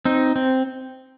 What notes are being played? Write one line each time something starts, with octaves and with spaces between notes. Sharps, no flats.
C4 D#4
C4